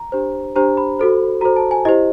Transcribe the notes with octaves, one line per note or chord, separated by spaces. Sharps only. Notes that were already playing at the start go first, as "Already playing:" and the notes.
Already playing: A#5
D4 G4 C5
D4 G4 C5 A#5
B5
F#4 A4 C5
F#4 A4 C5 A#5
A5
G#5
E4 G4 C5 D#5